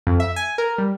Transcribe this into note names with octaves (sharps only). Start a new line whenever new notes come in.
F2
E5
G#5
A#4
G3